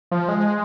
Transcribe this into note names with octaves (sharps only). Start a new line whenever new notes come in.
F3
G#3